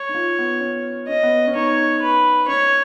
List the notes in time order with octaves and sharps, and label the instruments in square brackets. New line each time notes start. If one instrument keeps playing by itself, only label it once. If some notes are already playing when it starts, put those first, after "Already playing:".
Already playing: [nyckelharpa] C#5
[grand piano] D#4
F4
B3
C#4
[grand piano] C#4 [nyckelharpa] D#5
[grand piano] B3
C#4
[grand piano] D#4 [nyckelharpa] C#5
[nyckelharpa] B4
[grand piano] C#4 [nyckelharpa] C#5